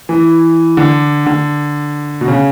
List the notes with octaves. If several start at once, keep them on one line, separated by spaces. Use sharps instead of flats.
E3
D3
D3
B2
C#3